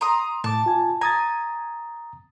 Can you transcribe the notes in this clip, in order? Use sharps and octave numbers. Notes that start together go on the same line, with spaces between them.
A#5 C6 D#6
A2 A5 D6
F4 G#5
G#5 A#5 D#6 A6